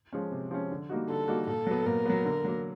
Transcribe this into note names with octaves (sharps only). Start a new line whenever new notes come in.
F3 G#3 C#4
C3
F3 G#3 C#4
D3
G3 A#3 D#4 F#4
D3 A4
G3 A#3 D#4 F#4
A#2 A4
F#3 B3
A#2 A#4
F#3 B3
D3
F#3 A#3